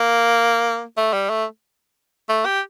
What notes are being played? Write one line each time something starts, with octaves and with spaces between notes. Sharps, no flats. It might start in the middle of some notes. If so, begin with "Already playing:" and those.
Already playing: A#3
A3
G3
A3
A3
G4